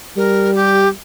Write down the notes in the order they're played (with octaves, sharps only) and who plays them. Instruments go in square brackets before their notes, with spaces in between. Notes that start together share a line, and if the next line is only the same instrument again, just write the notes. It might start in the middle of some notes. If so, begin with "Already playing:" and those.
[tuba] G3 [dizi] A#4
[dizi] G4